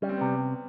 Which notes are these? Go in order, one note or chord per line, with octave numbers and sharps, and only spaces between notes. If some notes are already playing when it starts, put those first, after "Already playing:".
G3 C#4
C4
B3
C3